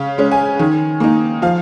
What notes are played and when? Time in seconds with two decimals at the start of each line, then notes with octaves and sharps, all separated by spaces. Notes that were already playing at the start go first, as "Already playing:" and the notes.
Already playing: C#3 F5
0.18 G#3 C#4
0.31 G#5
0.59 D#3
1.00 A#3 D#4
1.42 F3 F5